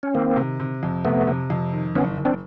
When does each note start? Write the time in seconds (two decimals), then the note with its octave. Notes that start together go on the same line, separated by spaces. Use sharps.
0.03 C#4
0.14 D#3 A#3 C4
0.36 C3
0.60 C3
0.83 F2
1.05 C3 A3 B3
1.27 C3
1.50 F2
1.73 D#3
1.95 F#1 B3 C#4
2.17 F#1
2.25 C4 D4